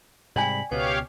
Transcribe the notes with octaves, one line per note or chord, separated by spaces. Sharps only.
G#2 C3 G3 D5 G5 G#5 B5
C#2 B2 B3 G4 C#5 F5